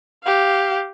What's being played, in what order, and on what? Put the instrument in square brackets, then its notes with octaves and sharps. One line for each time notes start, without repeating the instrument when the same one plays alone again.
[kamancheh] G4 F5